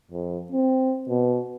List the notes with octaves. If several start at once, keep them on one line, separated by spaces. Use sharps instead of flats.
F2
C4
B2